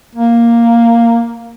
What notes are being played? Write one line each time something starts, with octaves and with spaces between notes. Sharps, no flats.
A#3